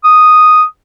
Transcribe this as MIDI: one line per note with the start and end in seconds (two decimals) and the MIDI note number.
0.04 0.64 87